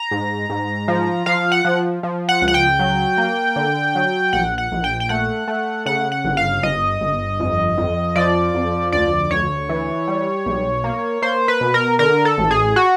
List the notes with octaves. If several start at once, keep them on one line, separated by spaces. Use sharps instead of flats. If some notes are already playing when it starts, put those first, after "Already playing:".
Already playing: A#5
G#2
G#2
F3
F3 F5
F#5
F3
F3
F#5
C#2
F#5
G5
F#3
A#3
D3
F#3
A#1 F#5
F#5
A#1
G5
G5
A3 F#5
A3
C#3 F#5
F#5
G1
F5
G1 D#5
G1
F2
F2
F3 D5
F2
D2 D5
D2 C#5
E3
G3
B1
A#3
A#3 C5
B4
B2
A#4
D3 A#4
A4
A1
G#4
F#4